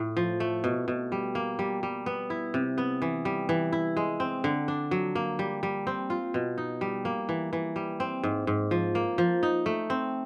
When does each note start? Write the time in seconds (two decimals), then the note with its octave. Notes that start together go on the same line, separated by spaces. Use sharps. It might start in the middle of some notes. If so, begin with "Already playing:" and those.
Already playing: A2
0.17 F3
0.40 A3
0.64 B2
0.88 B2
1.12 G3
1.35 A#3
1.59 G3
1.83 G3
2.06 B3
2.30 E4
2.54 C3
2.78 B3
3.02 E3
3.25 G3
3.49 E3
3.72 E4
3.97 G#3
4.20 C4
4.44 D3
4.68 D4
4.91 F#3
5.15 A#3
5.39 G3
5.63 G3
5.87 C4
6.10 F4
6.34 B2
6.58 D#4
6.81 G3
7.05 A#3
7.29 E3
7.53 E3
7.76 G3
8.00 C4
8.24 G#2
8.47 G#2
8.71 F3
8.95 A#3
9.18 F3
9.43 D#4
9.66 A3
9.90 C4